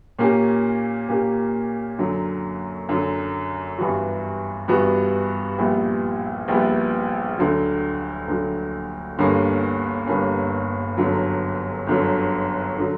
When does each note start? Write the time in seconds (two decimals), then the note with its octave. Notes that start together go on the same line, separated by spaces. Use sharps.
0.19 A#2 A#3 C#4 G4
1.09 A#2 A#3 C#4 G4
1.98 F#2 D3 F#3
2.89 F#2 D3 F#3
3.78 G2 E3 G3 B3 F#4
4.68 G2 E3 G3 B3 F#4
5.58 A#1 A#2 G3 B3 E4
6.48 A#1 A#2 G3 B3 E4
7.38 D2 D3 F#3
8.28 D2 D3 F#3
9.17 G1 G2 D3 A#3 C#4
10.07 G1 G2 D3 A#3 C#4
10.97 G1 F#2 D3 F#3
11.87 G1 F#2 D3 F#3
12.78 D3 F#3